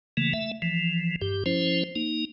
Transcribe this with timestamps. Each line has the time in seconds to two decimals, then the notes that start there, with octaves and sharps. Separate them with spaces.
0.17 C#3 E3 A3 A#3
0.33 A3 E5
0.62 E3 F3
1.21 G2 G4
1.46 F3 C#4 E4 C5
1.96 A#3 D#4